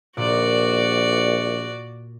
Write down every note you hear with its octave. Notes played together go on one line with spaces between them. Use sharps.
A#1 A#2 F#4 D5